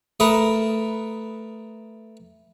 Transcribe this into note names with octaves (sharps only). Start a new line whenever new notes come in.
A3 A#4 B4 D#6